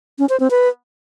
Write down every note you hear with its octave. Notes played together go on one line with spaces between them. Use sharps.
C#4
C5
C4
B4